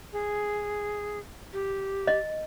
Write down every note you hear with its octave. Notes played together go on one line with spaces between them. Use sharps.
G#4
G4
D#5